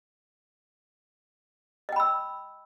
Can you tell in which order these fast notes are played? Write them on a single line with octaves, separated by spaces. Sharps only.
D#5 G5 B5 E6